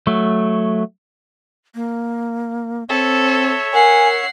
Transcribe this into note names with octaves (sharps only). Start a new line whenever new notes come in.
F#3 A3
A#3
C4 A4 C#5 E5
A#4 F#5 G#5 C7